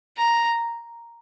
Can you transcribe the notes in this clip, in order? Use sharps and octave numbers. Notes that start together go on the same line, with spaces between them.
A#5